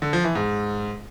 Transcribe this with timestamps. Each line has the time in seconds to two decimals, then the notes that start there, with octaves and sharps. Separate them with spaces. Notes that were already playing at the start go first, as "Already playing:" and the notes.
0.02 D3
0.13 F3
0.24 E3
0.35 G#2